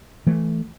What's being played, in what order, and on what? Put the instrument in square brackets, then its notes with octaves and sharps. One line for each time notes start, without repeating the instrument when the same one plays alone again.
[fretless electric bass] E3 A3